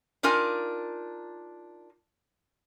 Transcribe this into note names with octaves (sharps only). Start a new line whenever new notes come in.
D4 D#4 F4 A#4 G#5